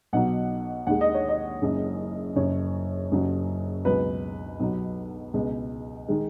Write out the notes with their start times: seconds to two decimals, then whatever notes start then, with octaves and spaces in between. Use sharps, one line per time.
0.13 B1 B2 F#3 F#5
0.87 D#2 D#3 G#3 F#5
1.01 D#5
1.14 C#5
1.29 D#5
1.62 F#1 F#2 C#3 G#3
2.35 F#1 F#2 C#3 C#5
3.11 F#1 F#2 C#3 F#3
3.85 C#2 B2 F#3 B4
4.60 B1 B2 F#3
5.34 C#2 B2 G#3
6.09 D#3 G#3